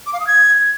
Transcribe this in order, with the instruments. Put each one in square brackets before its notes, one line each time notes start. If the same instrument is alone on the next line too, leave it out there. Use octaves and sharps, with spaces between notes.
[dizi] D6
F5
D#6
G#6